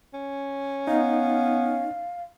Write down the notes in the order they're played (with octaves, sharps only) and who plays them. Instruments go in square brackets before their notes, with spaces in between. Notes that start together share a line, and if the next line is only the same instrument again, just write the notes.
[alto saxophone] C#4
[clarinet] B3 [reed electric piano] D#4 [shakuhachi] F5